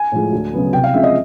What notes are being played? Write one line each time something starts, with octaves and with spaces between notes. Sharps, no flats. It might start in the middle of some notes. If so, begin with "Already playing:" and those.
Already playing: G#5
A2 F3 G#3
D2
C#3 F#3 B3
C2 G5
F5
C3 F3 G#3 C#4 E5
D#5